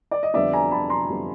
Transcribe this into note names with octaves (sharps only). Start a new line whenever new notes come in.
D5
D#5
F2 D3 G3 B3 D5 E5
G#5 A#5
A5 B5
A#5 C6
F2 D3 G3 B3